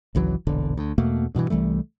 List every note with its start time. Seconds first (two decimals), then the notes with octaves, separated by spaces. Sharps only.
0.15 G#1 C#2 E3 F#3
0.47 E1 A#1 D3
0.77 D2
0.98 E2 B2 A3 A#3
1.35 G2 B2 D3 E3
1.50 C2 E3 G3 A3